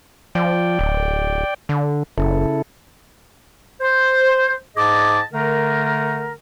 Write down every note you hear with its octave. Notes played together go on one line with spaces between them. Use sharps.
F3 D5 G5
D1
D3
F#1 C#3 E4 A4
C5
G#2 G#4 D#5 A5 D6
D3 A3 A#4